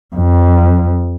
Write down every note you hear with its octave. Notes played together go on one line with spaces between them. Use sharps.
F2